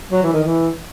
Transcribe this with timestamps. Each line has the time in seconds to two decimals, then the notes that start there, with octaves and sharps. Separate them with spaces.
0.12 F#3
0.23 E3
0.33 D#3
0.44 E3